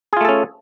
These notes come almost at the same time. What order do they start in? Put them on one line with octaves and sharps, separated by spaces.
G#4 F4 A3 A4 C#4